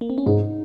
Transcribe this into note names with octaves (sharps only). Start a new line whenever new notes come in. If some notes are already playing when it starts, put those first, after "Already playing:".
A#3
C4
C#4
G#2 D#4